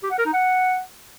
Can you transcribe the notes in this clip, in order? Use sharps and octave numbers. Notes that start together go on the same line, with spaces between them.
G4
F#5
A#4
D#4
F#5